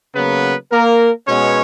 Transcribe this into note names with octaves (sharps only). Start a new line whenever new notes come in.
C#3 F#3 A#3 B3 B4
A#3 A#4
B2 G#3 B3 C#4 C#5